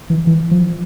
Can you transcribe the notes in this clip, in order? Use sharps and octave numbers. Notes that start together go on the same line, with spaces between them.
E3
E3
F3